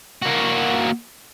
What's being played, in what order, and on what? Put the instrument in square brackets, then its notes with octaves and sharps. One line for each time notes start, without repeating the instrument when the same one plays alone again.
[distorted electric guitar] A#3 F#4